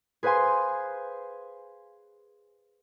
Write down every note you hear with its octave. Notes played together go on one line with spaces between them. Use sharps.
G#4 B4 C5 F5 G#5 C6